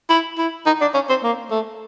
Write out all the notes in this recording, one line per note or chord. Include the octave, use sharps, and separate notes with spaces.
E4
E4
D#4
D4
C#4
C4
A#3
A3